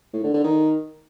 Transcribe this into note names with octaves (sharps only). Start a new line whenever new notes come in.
A2
D3
D3
D#3